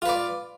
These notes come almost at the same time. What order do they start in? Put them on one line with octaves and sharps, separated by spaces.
F4 B4 D5